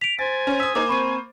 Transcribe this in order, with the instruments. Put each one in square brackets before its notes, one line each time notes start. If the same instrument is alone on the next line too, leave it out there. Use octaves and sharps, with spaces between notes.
[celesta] B6 D7 [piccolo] F7
[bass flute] C5 [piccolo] G#5 [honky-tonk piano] A6
[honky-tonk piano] C#4
[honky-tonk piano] D#6 E6 [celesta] B6
[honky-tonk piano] A#3 C5 [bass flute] D#4 [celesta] D6
[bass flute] C4 [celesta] B5 C#6 D#7